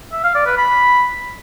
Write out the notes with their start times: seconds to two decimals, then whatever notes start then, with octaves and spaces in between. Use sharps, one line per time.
0.12 E5
0.24 F5
0.35 D5
0.46 B4
0.58 B5